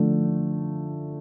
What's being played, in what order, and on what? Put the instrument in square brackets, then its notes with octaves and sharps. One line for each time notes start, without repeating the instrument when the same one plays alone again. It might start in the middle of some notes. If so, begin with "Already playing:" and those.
Already playing: [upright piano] D3 F3 A3